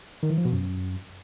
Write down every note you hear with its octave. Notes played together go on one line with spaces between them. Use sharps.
D#3
E3
F3
B2
F#2